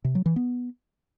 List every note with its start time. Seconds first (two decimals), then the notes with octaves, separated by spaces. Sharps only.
0.05 C3
0.15 F#3
0.26 E3
0.36 B3